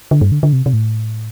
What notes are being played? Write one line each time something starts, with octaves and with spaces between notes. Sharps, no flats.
D3
G2
D3
D3
C3
C3
A2